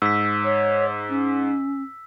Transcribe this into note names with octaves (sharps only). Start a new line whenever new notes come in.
G#2 E6 B6
C#5
C#4